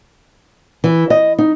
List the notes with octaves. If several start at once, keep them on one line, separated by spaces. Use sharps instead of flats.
E3
D#5
D#4